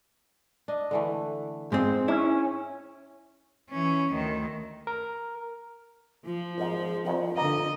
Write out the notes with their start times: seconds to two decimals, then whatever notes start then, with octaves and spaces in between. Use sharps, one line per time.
0.68 D4 D#5
0.91 D3 E3 A3
1.72 G#2 G#3 C4 D#4 F4
2.08 C#4 E4
3.70 E3 C#4
4.12 D2 D#3
4.87 A#4
6.26 F3 F4
6.58 G#1 G#2 G#4
7.05 C2 F2 D#3 F4
7.36 G2 D3 A#3 D#4 D#5